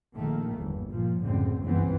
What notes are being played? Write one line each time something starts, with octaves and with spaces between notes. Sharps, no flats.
A#1 D#3 A3 A#3
G1 E2
A#2 F3
C#2 F#2 A2 D3 C4
F#1 C#2 G2 E3 B3 C4